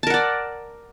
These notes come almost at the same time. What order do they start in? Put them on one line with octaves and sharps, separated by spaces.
A5 A#4 F#5 D5